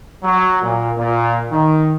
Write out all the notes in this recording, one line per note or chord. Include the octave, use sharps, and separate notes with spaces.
F#3
A#2
A#2
D#3